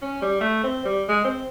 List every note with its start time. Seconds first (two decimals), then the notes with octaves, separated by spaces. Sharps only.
0.02 C#4
0.22 G3
0.41 A3
0.64 C4
0.85 G3
1.09 G#3
1.25 C4